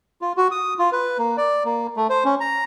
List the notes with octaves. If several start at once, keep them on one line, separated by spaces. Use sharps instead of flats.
F4
F#4
D#6
F4
B4
A#3
D5
A#3
A3
C5
C#4
A#5